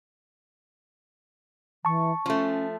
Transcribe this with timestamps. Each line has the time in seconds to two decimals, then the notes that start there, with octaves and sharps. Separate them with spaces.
1.85 E3 A5 C#6
2.26 F3 A3 C#4